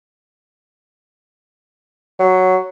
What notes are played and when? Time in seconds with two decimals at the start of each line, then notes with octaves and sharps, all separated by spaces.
2.19 F#3